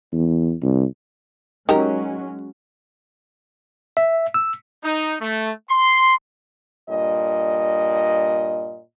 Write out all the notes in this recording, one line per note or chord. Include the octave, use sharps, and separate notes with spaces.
E2
C2
F#3 G#3 C#4 D#4 G4 A#4
E5
E6
D#4
A3
C6
G2 A#2 D#5